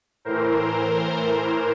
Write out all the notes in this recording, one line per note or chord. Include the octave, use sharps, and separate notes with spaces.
A2 E3 A#4 C5